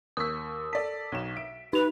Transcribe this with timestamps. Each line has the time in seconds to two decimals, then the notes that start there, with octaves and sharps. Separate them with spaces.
0.17 D#2 C#6 D#6 E6 B6
0.73 A4 D5 B6
1.12 B1 C#5 E7
1.35 E5 D7
1.73 D#4 B4 F7